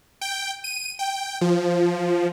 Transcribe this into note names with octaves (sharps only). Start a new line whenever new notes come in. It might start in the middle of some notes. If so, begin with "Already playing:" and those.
G5
D#7
G5
F3